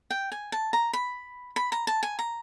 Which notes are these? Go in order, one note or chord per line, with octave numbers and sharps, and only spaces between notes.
G5
G#5
A5
A#5
B5
B5
A#5
A5
G#5
A#5